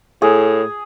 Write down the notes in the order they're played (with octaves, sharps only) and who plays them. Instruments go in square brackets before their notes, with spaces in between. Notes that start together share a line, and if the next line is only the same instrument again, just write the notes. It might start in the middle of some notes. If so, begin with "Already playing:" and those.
[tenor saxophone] A2 [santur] G#4